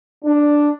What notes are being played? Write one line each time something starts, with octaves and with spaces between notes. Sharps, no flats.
D4